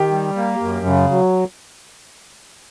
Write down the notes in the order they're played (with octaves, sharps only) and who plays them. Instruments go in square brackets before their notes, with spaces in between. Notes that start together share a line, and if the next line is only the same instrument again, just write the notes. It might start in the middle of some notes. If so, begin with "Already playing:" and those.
Already playing: [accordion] D#3 [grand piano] G4
[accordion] G3
A#3
F#2
C#3
F#3